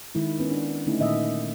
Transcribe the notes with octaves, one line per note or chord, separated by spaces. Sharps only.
D#3 G#3 E4
B3 C#4
D4
D3 A3 C#4 D#4 E4
A#2 D#3 A#3 D#5 E5